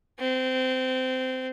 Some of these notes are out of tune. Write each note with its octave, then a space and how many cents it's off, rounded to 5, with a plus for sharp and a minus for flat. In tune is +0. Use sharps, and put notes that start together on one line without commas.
C4 -20